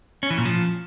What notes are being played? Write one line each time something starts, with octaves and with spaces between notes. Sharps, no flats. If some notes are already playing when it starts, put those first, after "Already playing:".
C#4
E3
A#2
F3